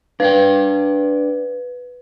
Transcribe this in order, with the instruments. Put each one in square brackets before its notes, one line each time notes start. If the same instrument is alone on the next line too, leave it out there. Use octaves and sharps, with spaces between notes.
[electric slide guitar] D4 D5 G5 [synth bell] B4